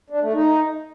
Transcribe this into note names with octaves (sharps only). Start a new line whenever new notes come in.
D4
A3
D#4